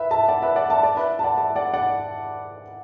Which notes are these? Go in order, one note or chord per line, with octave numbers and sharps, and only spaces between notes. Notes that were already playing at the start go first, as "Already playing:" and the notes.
Already playing: B4 E5
E5 A5
D5 F#5
B4 E5
D5 F#5
E5 A5
D5
B4 E5
A5
D5 F#5
E5 A5
D5 F#5
D5 F#5